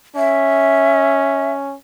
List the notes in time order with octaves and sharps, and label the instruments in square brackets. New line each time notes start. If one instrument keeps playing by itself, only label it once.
[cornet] C#4 [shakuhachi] E5